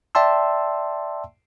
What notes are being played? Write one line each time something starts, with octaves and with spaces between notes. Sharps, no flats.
D5 E5 G5 A5 C6 E6